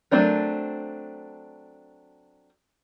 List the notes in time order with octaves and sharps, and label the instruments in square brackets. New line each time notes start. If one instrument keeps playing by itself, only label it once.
[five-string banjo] F#3 A3 C4 D4 A#4